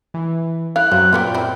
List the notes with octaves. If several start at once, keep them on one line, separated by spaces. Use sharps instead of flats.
E3
G3 E4 F5 F#6
F#2 C4
A#2 G3 B3 F4 G5
C4 E4